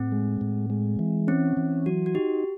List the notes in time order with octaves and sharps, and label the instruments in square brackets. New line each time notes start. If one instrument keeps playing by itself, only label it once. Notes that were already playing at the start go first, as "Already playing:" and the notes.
Already playing: [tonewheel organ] A2 [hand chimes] C4
[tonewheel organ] G#3
A2
G#3
E3
[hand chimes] C4 [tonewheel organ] C#4
[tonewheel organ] E3
[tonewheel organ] F#3 [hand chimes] F#4
[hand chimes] F#4
[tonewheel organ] D#4 [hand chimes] G4